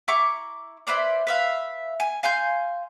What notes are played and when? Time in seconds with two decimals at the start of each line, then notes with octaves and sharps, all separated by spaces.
0.08 E4 A#5 C#6 D6
0.87 E4 B4 C5 D5
1.27 B4 E5 F5
2.00 G#5
2.23 F5 G#5 C6 G6